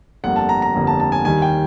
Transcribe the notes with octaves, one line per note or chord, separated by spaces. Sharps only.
G1 F2 D3 G3 A#3 F#5
A5
A#5
A#5
G1 F2 D3 G3 A#3
A5
A5
G#5
D#2 D#3 G3 G#5
G5